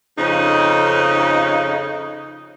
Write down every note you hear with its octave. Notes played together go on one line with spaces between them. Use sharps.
F2 C#3 D#4